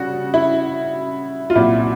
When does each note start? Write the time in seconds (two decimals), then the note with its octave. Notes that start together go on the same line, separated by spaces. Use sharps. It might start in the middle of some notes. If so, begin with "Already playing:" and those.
Already playing: C#3 G3 F#4
0.34 E4
1.50 F4
1.55 C2 A#2 F#3 E4